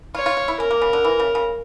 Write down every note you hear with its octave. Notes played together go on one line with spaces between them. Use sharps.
F4 C#5
F4
F4
E4
C#4 A#4
A#3
C#3
D3
E3
C#3
C#3